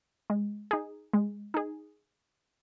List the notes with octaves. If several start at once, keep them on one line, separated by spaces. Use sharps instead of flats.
G#3
D#4 G#4
G#3
D#4 G#4